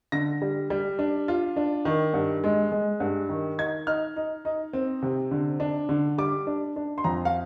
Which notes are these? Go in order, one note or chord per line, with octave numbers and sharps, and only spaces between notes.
D3 A#6
G3
G3
D4
F4
D4
D#3
G2
G#3
G#3
G2
D#3
D#4 G#6
D#4 F6
D#4
D#4
C4
C3
D3
D4
D3
G3 D6
D4
D4
C6
F2 A#5
F5